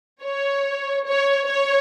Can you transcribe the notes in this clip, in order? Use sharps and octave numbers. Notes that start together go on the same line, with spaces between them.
C#5
C#5
C#5